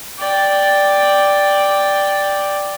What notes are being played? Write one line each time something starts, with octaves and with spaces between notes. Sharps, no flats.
D5 G5